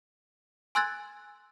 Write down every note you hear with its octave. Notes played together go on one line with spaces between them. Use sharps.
G#5 C6 E6 F#6 G#6 A6